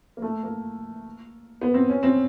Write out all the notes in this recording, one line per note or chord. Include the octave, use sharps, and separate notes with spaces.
A#3
A3
A#3
B3
C4
C#4
C4